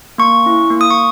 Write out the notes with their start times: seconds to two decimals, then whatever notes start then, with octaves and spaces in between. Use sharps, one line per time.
0.18 A#3 C#6
0.46 C#4 E4
0.70 A#3
0.81 D#6
0.91 C#6